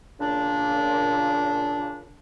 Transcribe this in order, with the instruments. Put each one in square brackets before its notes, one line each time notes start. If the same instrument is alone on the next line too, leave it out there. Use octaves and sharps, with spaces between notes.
[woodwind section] A#2 C#3 D4